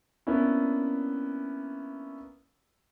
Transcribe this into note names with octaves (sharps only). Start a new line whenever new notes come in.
A#3 B3 C#4 D4 E4